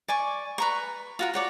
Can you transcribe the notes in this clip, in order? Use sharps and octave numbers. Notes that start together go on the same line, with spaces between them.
D5 G#5 C#6
B4 A#5 C#6
F4 F#4 A#4
F#4 C#5 D5